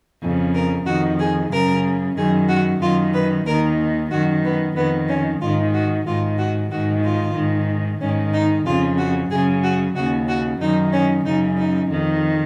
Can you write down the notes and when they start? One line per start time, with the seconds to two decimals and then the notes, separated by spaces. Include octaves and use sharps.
0.21 F2 C#3
0.54 A#4
0.85 F2 D#3 F#4
1.19 G#4
1.51 F#2 C#3 A#4
2.16 F#2 D#3 G#4
2.48 F#4
2.81 F#2 D#3 F4
3.13 B4
3.45 D#2 D#3 A#4
4.10 F#2 D#3 F#4
4.43 B3
4.76 F2 D#3 B3
5.08 C#4
5.40 G#2 D#3 F4
5.73 F#4
6.05 G#2 D#3 F4
6.37 F#4
6.70 G#2 D#3 F#4
7.03 F4
7.35 G#2 D#3
8.00 G#2 D#3 C#4
8.33 D#4
8.65 F2 C#3 F4
8.97 F#4
9.30 F#2 C#3 G#4
9.62 F#4
9.95 D#2 C#3 F#4
10.27 F#4
10.60 F#2 D#3 D#4
10.92 C#4
11.25 F#2 C#3 D#4
11.57 D#4
11.89 F2 D#3